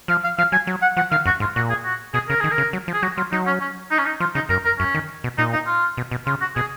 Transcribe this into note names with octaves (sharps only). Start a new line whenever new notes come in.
F3 F5
F5
F3 F5
F#3 G#5
F#3
F#5
F3 F#5
D#3 F5
F#2 F#4
G#2 F4
A#2 F#4
G#4
F#4
B2 G#4
C#3 A#4
D#3 G#4
A#4
C#3
F#3
F3
G#4
F#3 F#4
F#3 F4
F#3 D#4
C#4
C#4
D#4
C#4
D#4
F3 F4
C#3 D#4
F#2 A#4
A#4
F#2 C#4
D#3
B2
A#2 D#4
D#4
F4
B2
B2
C#3 F4
F#4
B2 G#4